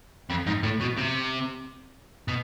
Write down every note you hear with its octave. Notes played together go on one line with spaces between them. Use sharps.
F2
G#2
A2
B2
C3
B2